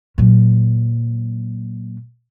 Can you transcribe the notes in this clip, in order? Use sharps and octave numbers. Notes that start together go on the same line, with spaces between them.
A#2 F#3